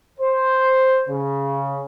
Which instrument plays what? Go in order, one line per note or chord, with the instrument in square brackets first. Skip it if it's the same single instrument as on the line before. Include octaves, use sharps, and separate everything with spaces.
[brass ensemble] C5
C#3